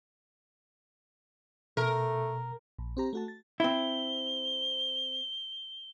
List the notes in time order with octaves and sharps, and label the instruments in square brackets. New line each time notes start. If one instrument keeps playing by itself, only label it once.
[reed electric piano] B2 [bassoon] A3 [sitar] A#4
[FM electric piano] A#1
C4 G4 A#5
A3 F#4 A5
A6
[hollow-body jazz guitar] C4 E4 [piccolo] G7